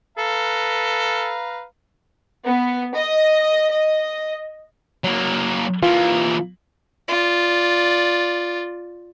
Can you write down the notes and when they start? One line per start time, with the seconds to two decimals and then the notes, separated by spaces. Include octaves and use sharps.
0.18 A4 B4 F5 A#5
2.45 B3
2.95 D#5
3.71 D#5
5.04 F#3 A#3
5.83 E3 A#3 F4
7.08 F4 D5